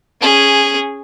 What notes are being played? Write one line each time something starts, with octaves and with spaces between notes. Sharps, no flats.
C#4 G#4